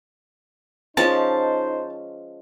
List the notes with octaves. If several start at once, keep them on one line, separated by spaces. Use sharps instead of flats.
F3 G#3 C#4 D#4 C5 A5